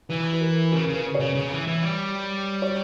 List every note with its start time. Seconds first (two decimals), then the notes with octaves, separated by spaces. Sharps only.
0.09 E3 B4
0.33 B4
0.41 A#4
0.72 C#3 A#4
0.88 C#3
0.94 B4
1.15 C#5
1.20 C#3
1.35 C#3
1.51 E3
1.68 E3
1.83 G3
2.62 C#5